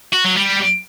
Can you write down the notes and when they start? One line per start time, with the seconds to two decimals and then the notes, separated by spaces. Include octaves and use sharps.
0.13 F#4
0.25 F#3
0.37 G3